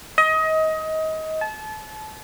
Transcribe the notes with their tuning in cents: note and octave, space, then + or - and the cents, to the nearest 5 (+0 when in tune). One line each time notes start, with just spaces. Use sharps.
D#5 +25
A5 -30